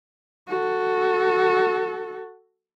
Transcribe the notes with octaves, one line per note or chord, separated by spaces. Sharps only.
F#4 A4